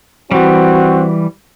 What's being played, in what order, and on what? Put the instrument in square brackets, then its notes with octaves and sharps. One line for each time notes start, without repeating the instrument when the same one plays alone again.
[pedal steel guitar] E3 G3 [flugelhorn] C4 [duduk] F#4